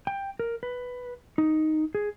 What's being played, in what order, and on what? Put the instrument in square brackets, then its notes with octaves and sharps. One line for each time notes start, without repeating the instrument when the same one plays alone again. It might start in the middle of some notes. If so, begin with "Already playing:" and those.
[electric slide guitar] G5
A#4
B4
D#4
G#4